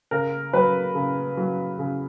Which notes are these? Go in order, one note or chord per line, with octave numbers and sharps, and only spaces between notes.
C#3 A#4
F#3 B4
C#3
F#3
C#3